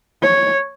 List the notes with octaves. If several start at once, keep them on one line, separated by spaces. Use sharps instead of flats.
C#5